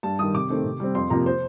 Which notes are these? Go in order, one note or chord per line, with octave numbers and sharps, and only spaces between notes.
G2 A5
D#3 G3 D#6
C3 D6
D#3 A3 C4
C3
G3 C4
F2 C6
C3 F3 A#3 A#5
C5